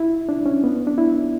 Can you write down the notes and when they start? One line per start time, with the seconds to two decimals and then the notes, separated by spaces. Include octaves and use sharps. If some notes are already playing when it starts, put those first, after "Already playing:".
Already playing: E4
0.29 D4
0.46 C#4
0.64 B3
0.87 D4
0.98 E4